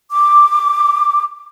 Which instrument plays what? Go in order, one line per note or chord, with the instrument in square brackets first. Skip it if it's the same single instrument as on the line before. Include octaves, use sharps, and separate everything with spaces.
[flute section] D6